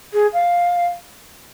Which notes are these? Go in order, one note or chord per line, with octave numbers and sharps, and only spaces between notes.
G#4
F5